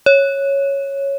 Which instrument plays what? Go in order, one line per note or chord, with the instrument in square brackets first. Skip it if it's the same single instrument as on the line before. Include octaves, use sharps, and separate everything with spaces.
[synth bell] C#5